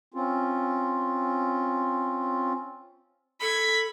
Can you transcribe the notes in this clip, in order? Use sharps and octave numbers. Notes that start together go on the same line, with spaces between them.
C4 C#4 F4
A4 B5 G#6